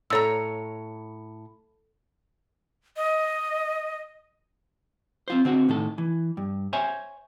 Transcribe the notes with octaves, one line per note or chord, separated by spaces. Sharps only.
A2 A4 C#5 A#5 E6
D#5
C4 F4 C5
D3 C4 F#4
A2 D#3 A4
E3
G2
C5 C#5 E5 G#5